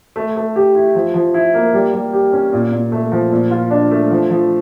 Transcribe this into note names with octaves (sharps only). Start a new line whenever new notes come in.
A3
A3
G4
E4
F3
F3
E4
A#3
G3
G3
G4
C#4
A#2
A#2
A3
F3
A#2
F4
D4
A3
F3
F3